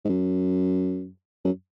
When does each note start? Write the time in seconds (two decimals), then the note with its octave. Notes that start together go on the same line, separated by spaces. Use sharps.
0.05 G#2
0.09 F#2
1.45 F#2